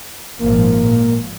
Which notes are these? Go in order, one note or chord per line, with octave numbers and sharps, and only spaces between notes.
G#1 A#2 F3 A#3
A#2